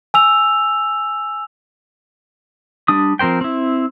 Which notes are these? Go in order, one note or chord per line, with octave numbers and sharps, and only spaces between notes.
G#5 E6 F7
G3 D4 D#6
F3 C4 A#4 C5 G5
C4 E4